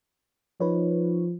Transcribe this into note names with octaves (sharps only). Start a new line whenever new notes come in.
F3 D#4 B4 C#5